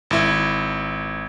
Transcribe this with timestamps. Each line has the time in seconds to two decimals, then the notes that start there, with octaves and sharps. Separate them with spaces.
0.11 G#1 E4